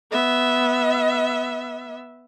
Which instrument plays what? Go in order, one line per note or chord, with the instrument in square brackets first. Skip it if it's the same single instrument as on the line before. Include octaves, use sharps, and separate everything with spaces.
[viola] B3 E5